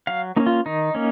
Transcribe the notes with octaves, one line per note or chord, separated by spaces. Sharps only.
F#3 F5
A#3 C#4 D#4
F4
D#3 D#4
A#3 C#4